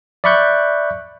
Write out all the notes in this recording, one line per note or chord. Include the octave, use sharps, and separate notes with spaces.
D5 E5 B5 C#6 F#6 G6